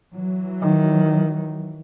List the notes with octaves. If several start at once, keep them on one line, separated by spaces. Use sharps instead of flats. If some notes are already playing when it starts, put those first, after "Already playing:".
E3 F#3
D#3